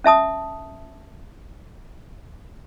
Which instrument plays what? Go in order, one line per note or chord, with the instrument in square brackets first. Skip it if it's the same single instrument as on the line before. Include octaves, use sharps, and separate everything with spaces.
[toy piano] C#4 E5 A5 D#6